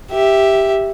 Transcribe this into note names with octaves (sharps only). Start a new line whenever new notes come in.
G4 E5